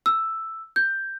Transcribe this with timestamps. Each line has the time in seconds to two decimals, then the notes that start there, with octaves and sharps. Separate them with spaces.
0.06 E6
0.76 G6